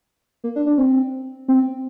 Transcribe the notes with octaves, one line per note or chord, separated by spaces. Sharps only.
A#3
D4
D4
C4
C4